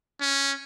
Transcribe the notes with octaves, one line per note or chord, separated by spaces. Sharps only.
C#4